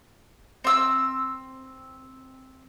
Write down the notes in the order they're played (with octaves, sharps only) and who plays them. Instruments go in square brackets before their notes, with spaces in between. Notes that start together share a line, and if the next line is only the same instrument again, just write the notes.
[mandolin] C4 E6